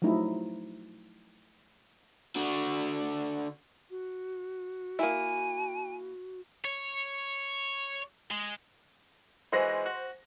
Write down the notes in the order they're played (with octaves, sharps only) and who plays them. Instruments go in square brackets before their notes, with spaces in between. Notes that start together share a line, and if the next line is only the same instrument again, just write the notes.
[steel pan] F3 F#3 A3 D#4 E4
[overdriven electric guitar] D3 F#4
[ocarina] F#4
[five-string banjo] A#3 E4 [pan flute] G#5
[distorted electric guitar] C#5
G#3
[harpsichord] E3 G#3 F#4 [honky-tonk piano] C5 A#6
[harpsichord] F#4